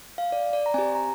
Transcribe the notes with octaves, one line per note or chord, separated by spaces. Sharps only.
F5
D5
D5
A#5
C4 G4 G#5
A#5